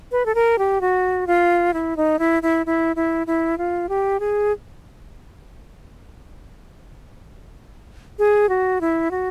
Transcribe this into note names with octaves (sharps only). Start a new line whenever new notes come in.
B4
A4
A#4
G4
F#4
F4
E4
D#4
E4
E4
E4
E4
E4
F4
G4
G#4
G#4
F#4
E4
F#4